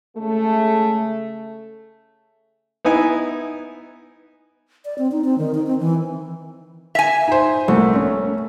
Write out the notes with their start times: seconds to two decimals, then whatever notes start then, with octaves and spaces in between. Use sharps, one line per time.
0.16 C#3 G#3 A3
2.85 B3 D#4 E4 G#5
4.85 D5
4.98 C4
5.12 D#4
5.25 C4
5.38 D#3
5.55 D#4
5.66 C4
5.80 E3
6.95 E5 G#5
7.28 D#4 C5
7.68 C2 A3 A#3
7.95 C#4